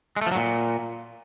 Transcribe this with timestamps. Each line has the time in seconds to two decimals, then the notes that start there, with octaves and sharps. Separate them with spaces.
0.16 G#3
0.22 A3
0.27 F3
0.32 F#3
0.37 A#2